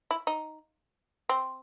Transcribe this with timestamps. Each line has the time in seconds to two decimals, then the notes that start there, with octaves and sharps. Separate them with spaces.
0.11 E4
0.27 D#4
1.29 C4